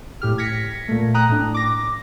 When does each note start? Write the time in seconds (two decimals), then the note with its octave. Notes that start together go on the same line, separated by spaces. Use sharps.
0.22 A2 G4 F6
0.38 G#6 A#6 B6 C#7
0.88 A#2 A3
1.14 G5 A#5 D#6 F#6
1.29 A2 D4
1.54 D6 A#6